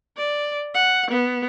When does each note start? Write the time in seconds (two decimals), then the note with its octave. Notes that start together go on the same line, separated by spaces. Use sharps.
0.17 D5
0.74 F#5
1.11 B3